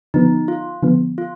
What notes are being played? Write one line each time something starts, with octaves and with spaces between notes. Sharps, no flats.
D3 F3 B3 D#4
F4
D3 F3 B3
F4